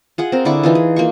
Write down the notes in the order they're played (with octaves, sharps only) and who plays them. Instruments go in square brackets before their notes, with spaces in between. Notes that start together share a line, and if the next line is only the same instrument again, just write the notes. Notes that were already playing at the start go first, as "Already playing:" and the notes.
[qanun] F4 G#4 F#5
C4 A#4
D3 E4 D5 C#6
E3 D#4 F4
G#4
A#3 F4 C#6